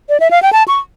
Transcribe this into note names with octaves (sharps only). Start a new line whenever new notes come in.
D5
E5
F5
G5
A5
C#6